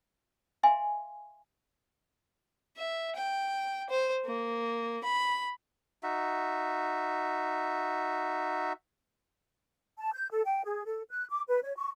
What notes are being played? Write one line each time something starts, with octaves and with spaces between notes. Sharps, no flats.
E5 F5 G#5 C6
E5
G5
C5
A#3
B5
D#4 F#4 E5
A5
G6
A4
G5
G#4
A4
F#6
D6
B4
C#5
C#6